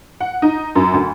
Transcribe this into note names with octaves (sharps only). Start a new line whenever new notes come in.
F#5
D#4
F#2
D2